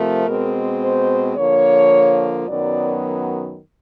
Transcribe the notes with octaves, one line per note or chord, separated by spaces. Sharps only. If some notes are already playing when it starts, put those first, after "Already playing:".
Already playing: C3 F3 A3 A#4
B2 G#3 C4
C5
D3 F3 A#3 C#5
F#2 D#3 F#3 B3 D5